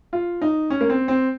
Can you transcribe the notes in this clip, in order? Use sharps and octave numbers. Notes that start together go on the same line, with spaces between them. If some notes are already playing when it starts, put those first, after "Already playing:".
F4
D#4
C#4
A#3
C4
C4